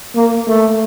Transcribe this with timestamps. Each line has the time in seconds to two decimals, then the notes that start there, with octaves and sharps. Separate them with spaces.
0.15 A#3
0.47 A3